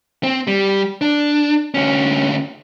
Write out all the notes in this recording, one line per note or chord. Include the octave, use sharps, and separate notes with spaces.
C4
G3
D4
D2 C#4